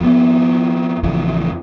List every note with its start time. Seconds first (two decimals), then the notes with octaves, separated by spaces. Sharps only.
0.01 F2 B3
1.03 A1 F2 C#3 E3